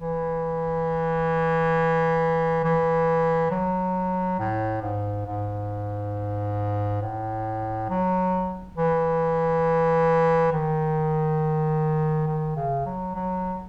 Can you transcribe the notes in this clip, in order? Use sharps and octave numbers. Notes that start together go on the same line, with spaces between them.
E3
E3
F#3
A2
G#2
G#2
A2
F#3
E3
D#3
D#3
C#3
F#3
F#3